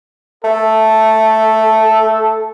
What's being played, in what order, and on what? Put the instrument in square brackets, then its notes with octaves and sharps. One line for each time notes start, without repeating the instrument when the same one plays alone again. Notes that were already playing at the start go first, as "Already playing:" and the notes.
[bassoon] A3 [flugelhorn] A4